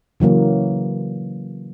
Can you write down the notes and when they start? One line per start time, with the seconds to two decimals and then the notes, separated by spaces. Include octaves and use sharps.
0.20 C#3 E3 F#3 A#3